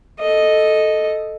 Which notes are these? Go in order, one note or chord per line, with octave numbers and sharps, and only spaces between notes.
A4 D#5